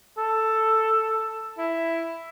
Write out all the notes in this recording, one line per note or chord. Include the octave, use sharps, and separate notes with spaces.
A4
E4